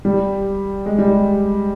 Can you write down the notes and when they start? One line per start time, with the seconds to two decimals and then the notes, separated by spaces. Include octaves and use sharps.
0.05 G3
0.86 G#3
0.98 G3